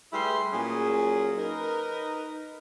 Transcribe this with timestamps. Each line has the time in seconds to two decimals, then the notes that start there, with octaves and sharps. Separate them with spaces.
0.13 G3 A3 E4 G#4 B4 C6
0.52 A#2 F#3 C#4 G#4
1.38 D#4 A#4 B4